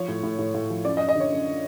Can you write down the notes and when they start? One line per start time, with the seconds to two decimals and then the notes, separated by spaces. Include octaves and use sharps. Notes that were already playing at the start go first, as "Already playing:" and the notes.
Already playing: F3 C#5
0.08 A2
0.23 A2
0.39 A2
0.54 A2
0.70 F3
0.84 F#2 D5
0.97 D#5
1.00 F#2
1.09 D#5
1.15 D3 C#5
1.32 F#2